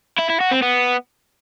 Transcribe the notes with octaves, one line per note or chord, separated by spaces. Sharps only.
E4
E4
F#4
C4
B3